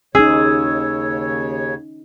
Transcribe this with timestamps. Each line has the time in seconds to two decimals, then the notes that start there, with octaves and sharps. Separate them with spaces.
0.15 D#2 C#3 C#4 D#4 G#4 C#5 E6